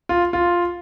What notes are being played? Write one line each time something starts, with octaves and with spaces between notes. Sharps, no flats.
F4
F4